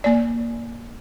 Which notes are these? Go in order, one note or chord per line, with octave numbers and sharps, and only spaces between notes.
A#3 D5